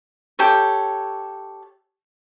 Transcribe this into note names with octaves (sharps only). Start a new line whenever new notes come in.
G4 A4 C#5